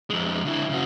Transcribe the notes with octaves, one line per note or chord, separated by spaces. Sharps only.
F2 G#3
D3 E4
C#3 F#4